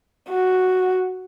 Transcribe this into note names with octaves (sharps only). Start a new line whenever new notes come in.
F#4